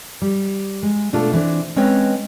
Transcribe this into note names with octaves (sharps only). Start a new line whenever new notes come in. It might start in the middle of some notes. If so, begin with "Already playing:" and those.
G3
G#3
B2 A3 D4 F4 A4
E3 C4 D4
G#3 C4 C#4 B4 C#5 D#5